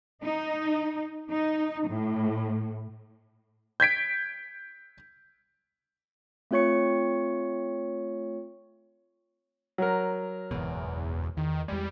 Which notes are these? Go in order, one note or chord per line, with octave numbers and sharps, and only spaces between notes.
D#4
D#4
A2
G6 G#6 B6 D7
A3 C4 F4 C#5 C#6 C#7
F#3 A#4
F#1 E2 G#2 B2
E2 D#3
E2 G3 G#3